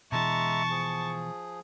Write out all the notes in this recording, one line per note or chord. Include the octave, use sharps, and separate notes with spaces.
B2 E3 G#3 E5 A5 A#5 C#6
F3 G#4